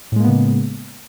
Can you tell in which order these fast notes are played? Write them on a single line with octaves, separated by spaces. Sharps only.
A2 G#3 A#3 B3 C#3